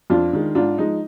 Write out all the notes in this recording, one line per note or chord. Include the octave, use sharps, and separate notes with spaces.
F2 D4 F4
D#3 G#3
G#2 D4 F4
F3 G#3 D#4